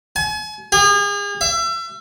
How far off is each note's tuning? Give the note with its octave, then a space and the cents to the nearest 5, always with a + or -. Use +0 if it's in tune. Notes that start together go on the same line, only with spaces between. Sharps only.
G#5 +40
G#4 -40
E5 +35